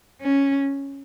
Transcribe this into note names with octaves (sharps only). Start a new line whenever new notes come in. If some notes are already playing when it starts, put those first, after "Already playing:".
C#4